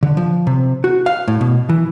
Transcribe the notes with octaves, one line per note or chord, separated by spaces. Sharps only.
D3
F3
C3
F#4
F5
A2
B2
E3